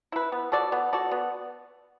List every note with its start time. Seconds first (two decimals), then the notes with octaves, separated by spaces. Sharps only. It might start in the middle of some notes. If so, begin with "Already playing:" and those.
0.12 E4 B4
0.32 B3
0.52 F#4 A4 D5
0.72 B3
0.93 F#4 A4 D5
1.11 B3